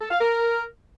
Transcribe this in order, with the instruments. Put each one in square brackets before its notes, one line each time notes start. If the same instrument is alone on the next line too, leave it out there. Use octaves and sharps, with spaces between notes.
[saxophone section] A4
F5
A#4